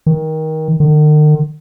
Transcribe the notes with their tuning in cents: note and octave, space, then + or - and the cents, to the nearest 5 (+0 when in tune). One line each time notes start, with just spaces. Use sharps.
D#3 +20
D#3 -45